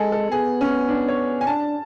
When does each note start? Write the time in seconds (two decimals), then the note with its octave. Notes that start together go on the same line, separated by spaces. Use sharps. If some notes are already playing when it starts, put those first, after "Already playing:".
Already playing: G#3 G#4 A4
0.12 A4
0.31 B3 G#4
0.61 C#4
0.89 D4
1.09 C#5
1.41 G#5
1.47 D4 A5